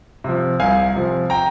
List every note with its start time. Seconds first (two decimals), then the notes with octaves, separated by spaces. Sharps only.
0.24 C3 F3
0.59 C2 F5 G#5
0.95 C3 F3
1.30 G5 A#5